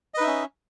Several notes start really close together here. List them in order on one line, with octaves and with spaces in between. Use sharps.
D#5 B4 D#4 E5 C#4